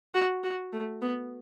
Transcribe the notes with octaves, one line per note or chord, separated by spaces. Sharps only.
F#4
F#4
A3
B3